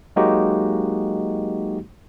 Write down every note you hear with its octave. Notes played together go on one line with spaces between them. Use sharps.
F#3 G#3 A#3 D#4 F#4 G4